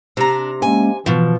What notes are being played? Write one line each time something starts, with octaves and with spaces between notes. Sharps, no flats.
C3 D4 A#5
G#3 A#3 C#4 G#5
B2 E3 F3